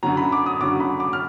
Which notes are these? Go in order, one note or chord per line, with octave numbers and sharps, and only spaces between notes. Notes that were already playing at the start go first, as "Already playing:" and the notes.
F#2 D3 F#3 A#5
B5
D6
D#6
F#2 D3 F#3 D6
B5
D6
F6